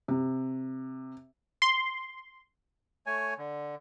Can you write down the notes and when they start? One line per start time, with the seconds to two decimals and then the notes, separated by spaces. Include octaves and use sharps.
0.08 C3
1.62 C6
3.07 A3 C#5 G#5
3.38 D3